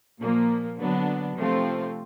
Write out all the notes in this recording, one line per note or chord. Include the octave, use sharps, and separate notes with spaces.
A#2 F3 A#3
D3 F#3 B3 D4
C3 F3 A3 C4 F4